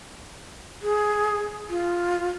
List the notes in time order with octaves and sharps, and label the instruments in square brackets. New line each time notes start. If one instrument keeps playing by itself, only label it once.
[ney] G#4
F4